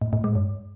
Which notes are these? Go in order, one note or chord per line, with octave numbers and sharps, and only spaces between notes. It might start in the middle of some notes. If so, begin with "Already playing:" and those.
A2
A2
G#3
G2